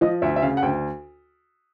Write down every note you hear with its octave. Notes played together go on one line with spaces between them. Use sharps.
F3 D#5
D2 E5
E5
C#3 F5
F#5
D2 G5